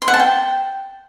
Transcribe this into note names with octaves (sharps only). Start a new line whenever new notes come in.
C6
F#5
A5
G5